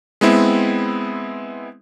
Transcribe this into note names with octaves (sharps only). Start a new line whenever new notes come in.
G#3 B3 C4 E4